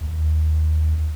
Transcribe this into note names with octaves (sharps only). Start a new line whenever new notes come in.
D#2